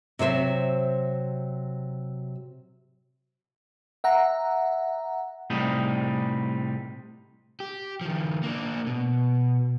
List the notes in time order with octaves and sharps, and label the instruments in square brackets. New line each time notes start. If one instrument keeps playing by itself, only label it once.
[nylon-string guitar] C3 F#3 C5 E5
[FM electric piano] E5 F#5 A#5
[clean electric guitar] A2 C3 G3 D#4
[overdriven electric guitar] G4
D#3 F3
A#3 D4
B2